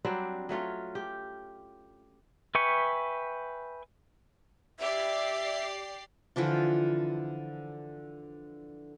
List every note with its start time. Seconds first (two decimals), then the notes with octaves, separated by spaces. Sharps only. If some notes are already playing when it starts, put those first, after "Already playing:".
0.05 F#3 G3 C4 D4
0.49 F#3 A3 C#4 F4
0.95 G4
2.55 B4 E5 G5 G#5 C#6
4.80 G4 D5 E5 C7
6.36 D3 E3 F3 F4